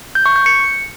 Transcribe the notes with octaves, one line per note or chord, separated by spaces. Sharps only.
G6
C#6
G6
C#7